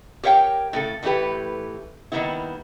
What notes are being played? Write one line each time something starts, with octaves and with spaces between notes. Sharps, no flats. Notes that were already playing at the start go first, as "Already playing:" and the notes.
G4 A#4 C#5 F5 G5
A2 C#3 A4
A2 E3 A3 D#4 G4 B4
D#3 F3 G3 A#3 B3 E4